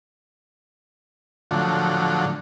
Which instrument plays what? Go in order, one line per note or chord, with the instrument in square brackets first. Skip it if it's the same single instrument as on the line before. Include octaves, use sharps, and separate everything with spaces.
[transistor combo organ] A2 D3 F3 F#3